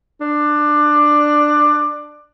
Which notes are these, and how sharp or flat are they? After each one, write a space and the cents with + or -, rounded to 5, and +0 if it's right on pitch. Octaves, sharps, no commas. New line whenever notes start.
D4 +15